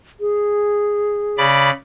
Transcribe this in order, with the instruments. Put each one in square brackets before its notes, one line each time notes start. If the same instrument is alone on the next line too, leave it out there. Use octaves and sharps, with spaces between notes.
[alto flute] G#4
[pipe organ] C#3 D5 B5